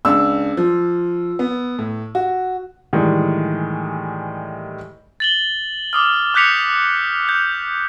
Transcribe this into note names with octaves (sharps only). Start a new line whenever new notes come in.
C#2 D4 E6
F3
B3
A2
F#4
A2 D#3 E3 G3 G#3
A6 F#7 G7
D6 D#6 F6
D6 F#6 G6 B6 C#7 F7
G6